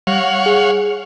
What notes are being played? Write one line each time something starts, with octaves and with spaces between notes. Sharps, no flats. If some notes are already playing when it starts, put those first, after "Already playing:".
G3 C#5 F5 F#5
G#4